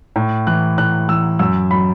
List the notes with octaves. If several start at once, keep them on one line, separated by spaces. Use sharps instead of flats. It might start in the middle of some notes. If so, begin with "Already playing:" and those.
A2
E3 F#6
A2 F#6
E3 E6
F#2 E6
F#3 B5